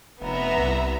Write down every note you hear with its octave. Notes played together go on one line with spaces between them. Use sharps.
F1 B3 E5 A#5
C2